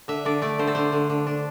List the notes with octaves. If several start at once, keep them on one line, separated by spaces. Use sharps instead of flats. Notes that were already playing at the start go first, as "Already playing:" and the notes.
D3 E5
D3 D5
A3 D5
D3 C5
A4
D3 C5
D3
D3
D4